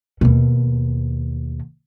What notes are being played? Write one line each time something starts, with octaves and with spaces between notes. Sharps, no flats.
D#2 B2